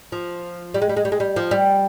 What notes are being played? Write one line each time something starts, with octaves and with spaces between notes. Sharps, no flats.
F3
G3
G#3
G3
G#3
G3
G#3
G3
F3
G3